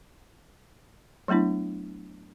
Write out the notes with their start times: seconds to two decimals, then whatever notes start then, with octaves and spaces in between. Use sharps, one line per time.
1.28 F#3 A3 B3 D4 E4